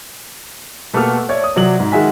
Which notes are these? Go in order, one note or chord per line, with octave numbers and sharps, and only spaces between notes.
B2 A3 A#3 G4 A4 F6
C#5 D5 E5 G#6
D#6
C3 F#3 D5 F#7
G#2
D#3 G#3 F#4 E5 G#5 B6